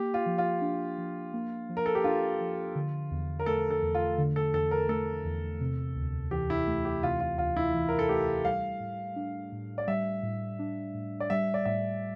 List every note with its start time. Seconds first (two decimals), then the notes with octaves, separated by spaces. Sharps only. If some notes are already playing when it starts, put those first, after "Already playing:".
Already playing: A#3 G4
0.14 F4
0.26 F3
0.38 F4
0.61 D4
0.98 F3
1.34 A#3
1.69 F3
1.77 A#4
1.86 A4
1.95 G4
2.04 D4 F4
2.40 F3
2.75 D3
3.11 E2
3.40 A#4
3.46 A3 A4
3.71 A4
3.83 E2
3.95 F4
4.18 D3
4.36 A4
4.54 E2 A4
4.71 A#4
4.89 A3 A4
5.25 E2
5.61 C3
5.96 D2
6.31 E3 G4
6.50 E4
6.67 A3
6.85 G4
7.03 C3 F4
7.20 F4
7.38 D2 F4
7.56 E4
7.74 E3
7.89 A#4
7.99 A4
8.09 A3 G4
8.45 G3 F5
8.80 A2
9.16 D4
9.52 A2
9.78 D5
9.87 G3 E5
10.23 A2
10.59 D4
10.95 A2
11.20 D5
11.30 G3 E5
11.54 D5
11.65 A2 E5